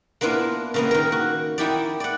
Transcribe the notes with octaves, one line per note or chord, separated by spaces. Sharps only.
A#3 B3 D4 E4 F4
C#3 A#3 B3
D#3 A#4
F#4
D#4 E4 G4 D5
D5 F#5